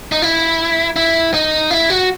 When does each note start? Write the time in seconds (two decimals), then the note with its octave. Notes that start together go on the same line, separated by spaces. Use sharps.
0.12 D#4
0.22 E4
0.96 E4
1.34 D#4
1.71 E4
1.90 F#4